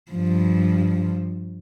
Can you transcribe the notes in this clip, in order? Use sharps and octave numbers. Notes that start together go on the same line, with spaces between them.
G2 F3